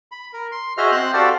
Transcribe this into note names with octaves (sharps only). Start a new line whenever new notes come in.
B5
A#4
C6
F#4 G#4 C5 D#5 E5 F6
C4 C5 C6 F#6
F#4 G4 A4 C5 D5 F5